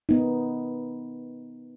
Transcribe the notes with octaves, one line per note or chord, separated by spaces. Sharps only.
B3 D#4